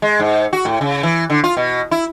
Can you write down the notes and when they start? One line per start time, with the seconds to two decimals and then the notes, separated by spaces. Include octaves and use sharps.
0.02 G#3
0.20 G#2
0.53 F#4
0.65 A2
0.81 C#3
1.03 E3
1.30 D3
1.44 F4
1.57 B2
1.91 E4